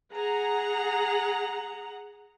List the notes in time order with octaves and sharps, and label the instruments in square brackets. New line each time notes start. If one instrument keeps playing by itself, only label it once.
[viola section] G#4 F#5 A#5